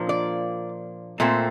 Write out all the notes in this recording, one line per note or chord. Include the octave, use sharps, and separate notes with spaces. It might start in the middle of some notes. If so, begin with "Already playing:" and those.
Already playing: A#2 F3 A#3 D4
D5
A#2 A3 C4